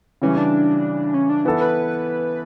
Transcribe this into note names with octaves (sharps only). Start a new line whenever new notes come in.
C#3 E3 G3 C#4
D4
C#4
D4
E3 B3 E4 A4
B4